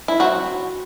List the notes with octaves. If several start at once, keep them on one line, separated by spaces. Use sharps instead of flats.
E4
F#3 C4 F#4